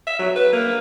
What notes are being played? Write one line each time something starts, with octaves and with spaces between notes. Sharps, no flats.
E5
F#3
B4
A#3